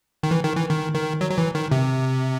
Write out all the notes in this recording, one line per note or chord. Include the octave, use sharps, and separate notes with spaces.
D#3
E3
D#3
E3
D#3
D#3
F#3
F#3
E3
D#3
C3